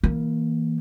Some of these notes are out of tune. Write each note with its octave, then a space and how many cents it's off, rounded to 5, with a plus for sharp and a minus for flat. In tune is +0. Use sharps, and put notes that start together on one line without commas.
E3 -30 A#3 +0